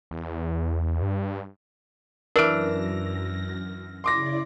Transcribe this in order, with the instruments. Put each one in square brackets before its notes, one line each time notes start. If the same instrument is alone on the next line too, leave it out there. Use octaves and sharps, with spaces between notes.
[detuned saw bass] E2
G2
[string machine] F#2 A#6 [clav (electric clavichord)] E3 D4 [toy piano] A#4 [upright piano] E6 F6 D7
[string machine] C#3 E4 D5 [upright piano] C6 D6 A#6